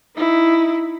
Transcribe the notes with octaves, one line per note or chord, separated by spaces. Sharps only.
D#4 E4